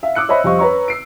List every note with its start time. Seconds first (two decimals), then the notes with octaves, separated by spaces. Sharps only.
0.03 E5 F5
0.15 D6 E6 F#6 C#7
0.29 C5 C#5 D#5 E5 B5
0.44 F2 G3 C5 D#5 F5 C#6
0.59 B4 C#5 A#5 C#6
0.88 E6 C7 D7